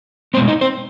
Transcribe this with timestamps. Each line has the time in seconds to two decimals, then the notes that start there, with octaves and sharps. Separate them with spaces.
0.34 B2 G#3 B3 C4 C5
0.48 D#4 D#5
0.61 C4 C5